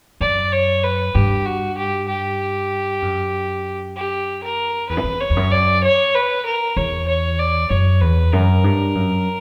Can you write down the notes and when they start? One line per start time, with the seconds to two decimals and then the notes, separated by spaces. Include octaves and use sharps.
0.21 F#2 D5
0.52 C#5
0.83 B4
1.15 G2 G4
1.45 F#4
1.77 G4
2.08 G4
3.02 F#2
3.96 G4
4.43 A#4
4.89 E2 B4
4.97 F#2
5.04 E2
5.20 C#5
5.30 E2
5.36 F#2
5.51 D5
5.84 C#5
6.15 B4
6.46 A#4
6.77 E2 C#5
7.07 C#5
7.39 D5
7.70 F#2 C#5
8.01 E2 B4
8.32 F#2 A#4
8.64 G2
8.95 F#2